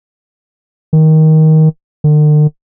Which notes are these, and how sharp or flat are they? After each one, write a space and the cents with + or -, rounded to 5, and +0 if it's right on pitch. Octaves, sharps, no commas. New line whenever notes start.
D#3 +15
D3 +45